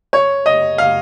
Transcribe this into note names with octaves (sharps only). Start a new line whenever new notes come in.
C#5
D#5
F5